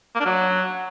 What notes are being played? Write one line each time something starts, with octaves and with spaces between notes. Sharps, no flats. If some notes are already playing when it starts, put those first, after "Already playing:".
A#3
D4
F#3